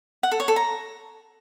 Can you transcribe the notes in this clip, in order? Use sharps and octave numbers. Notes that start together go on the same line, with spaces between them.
F#5
A4
C#5
A4
A#5